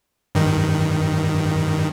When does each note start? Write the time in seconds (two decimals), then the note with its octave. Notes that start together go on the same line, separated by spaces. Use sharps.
0.35 G2 D#3